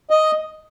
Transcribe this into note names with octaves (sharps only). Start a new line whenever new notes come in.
D#5